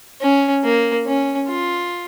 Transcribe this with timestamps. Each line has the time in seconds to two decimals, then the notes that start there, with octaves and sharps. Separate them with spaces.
0.21 C#4
0.64 A#3
1.07 C#4
1.49 F4